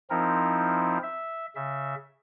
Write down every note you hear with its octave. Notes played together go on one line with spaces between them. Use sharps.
F3 C4 D#4 E4 A#4
E5
C#3 E5